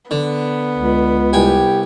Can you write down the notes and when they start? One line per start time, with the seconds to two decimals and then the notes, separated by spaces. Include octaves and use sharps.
0.11 D3 B3
0.78 C#2
1.33 C2 G4 G5 G#5